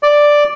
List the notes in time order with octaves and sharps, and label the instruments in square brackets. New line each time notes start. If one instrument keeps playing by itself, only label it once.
[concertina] D5